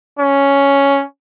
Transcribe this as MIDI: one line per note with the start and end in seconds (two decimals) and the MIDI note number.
0.19 1.03 61